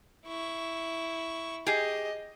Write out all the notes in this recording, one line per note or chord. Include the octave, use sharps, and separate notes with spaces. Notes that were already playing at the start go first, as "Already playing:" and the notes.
E4 C#6
G4 G#4 D#5